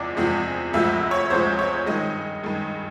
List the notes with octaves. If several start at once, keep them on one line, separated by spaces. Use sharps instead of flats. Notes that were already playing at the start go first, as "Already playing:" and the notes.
Already playing: E2 C3 F3 G#3 D5
E2 C3 F3 G#3
D2 C3 F3 G#3 E5
C#5
D2 C3 F3 G#3 C5
C#5
G2 D#3 G#3 D#5
G2 D#3 G#3